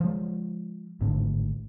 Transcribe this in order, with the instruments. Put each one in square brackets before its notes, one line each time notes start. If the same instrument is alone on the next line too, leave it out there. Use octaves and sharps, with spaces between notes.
[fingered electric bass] F3 G#3
G#1 A2 D3